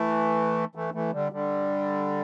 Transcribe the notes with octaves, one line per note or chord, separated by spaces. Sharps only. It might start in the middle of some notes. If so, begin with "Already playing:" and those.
Already playing: E3 A3
E3 A3
E3 A3
D3 G3
D3 G3